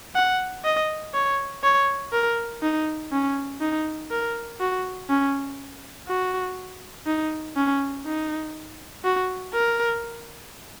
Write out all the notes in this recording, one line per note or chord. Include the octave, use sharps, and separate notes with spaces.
F#5
D#5
C#5
C#5
A#4
D#4
C#4
D#4
A#4
F#4
C#4
F#4
D#4
C#4
D#4
F#4
A#4